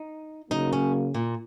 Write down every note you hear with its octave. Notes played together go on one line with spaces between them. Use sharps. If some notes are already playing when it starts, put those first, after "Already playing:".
Already playing: D#4
C#3 F#3 A#3 D#4
C#4
A#2